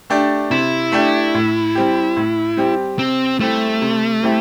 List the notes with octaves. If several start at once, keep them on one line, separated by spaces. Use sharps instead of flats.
A3 D4 G4
C3 E4
A3 D4 G4
A2
G3 C4 G4
A2
G3 C4 G4
C3 C4
G3 A3 C4 E4 G4
C3
G3 C4 E4 G4